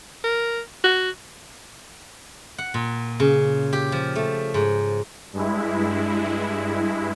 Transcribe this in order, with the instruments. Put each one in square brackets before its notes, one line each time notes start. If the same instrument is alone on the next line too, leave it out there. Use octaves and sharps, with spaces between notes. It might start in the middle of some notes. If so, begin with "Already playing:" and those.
[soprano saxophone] A#4
F#4
[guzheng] F#5
A#2
C#3
G4
F3
A3
G#2
[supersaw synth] G2 G#3 E4